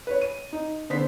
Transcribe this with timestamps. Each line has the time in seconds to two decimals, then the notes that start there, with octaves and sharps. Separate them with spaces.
0.07 B4 C#5
0.21 D#7
0.53 D#4
0.90 D3 B3 C5 B6